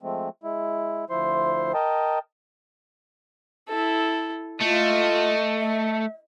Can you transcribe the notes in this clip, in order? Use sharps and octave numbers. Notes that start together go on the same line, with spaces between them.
F3 G#3 A3 C4
G#3 E4
D2 F3 E4 C5 C6
A#4 D#5 G5 A5
E4 A4
A3 F4 D#5
E5